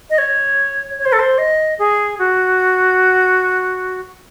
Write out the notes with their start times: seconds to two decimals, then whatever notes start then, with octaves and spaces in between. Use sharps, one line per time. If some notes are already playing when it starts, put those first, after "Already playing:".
0.10 D#5
0.18 C#5
0.99 C#5
1.05 C5
1.13 A4
1.19 C5
1.38 D#5
1.79 G#4
2.19 F#4